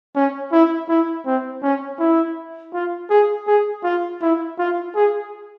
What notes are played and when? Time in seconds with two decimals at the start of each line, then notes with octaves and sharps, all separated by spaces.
0.15 C#4
0.52 E4
0.89 E4
1.26 C4
1.63 C#4
2.00 E4
2.73 F4
3.10 G#4
3.47 G#4
3.84 F4
4.21 E4
4.58 F4
4.95 G#4